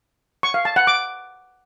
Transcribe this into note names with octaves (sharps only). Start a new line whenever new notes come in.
C#6
F5
A5
F#5
D6